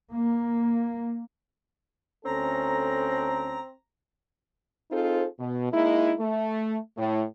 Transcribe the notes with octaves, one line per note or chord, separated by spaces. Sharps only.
A#3
D2 C4 C#4 A4 A#5
C4 D#4 F4 G#4 A4 C5
B2
G#3 A#3 D#4 E4
A3
A2